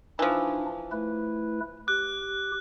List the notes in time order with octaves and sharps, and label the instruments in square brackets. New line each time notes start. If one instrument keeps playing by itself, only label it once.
[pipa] E3 F3 [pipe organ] D4 D#4
[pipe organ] A3 E4 B4
[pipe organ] G4 [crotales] F#6